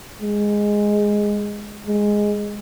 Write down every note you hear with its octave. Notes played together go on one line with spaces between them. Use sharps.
G#3
G#3